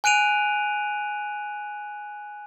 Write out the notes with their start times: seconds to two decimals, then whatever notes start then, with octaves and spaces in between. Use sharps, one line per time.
0.04 G#5 F#6 D7 D#7 F7